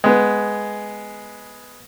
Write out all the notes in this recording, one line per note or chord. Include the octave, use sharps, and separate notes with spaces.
G#3 B3